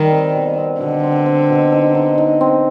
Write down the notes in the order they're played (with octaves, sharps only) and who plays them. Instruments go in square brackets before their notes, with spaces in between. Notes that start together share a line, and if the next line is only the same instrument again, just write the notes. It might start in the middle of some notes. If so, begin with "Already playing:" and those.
Already playing: [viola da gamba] D#3 [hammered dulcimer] G3 D#4
[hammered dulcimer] C4
B2
C4
[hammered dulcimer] B2 [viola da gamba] D3
[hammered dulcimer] C4
C4
B2
D#4
D#4
D#4
C4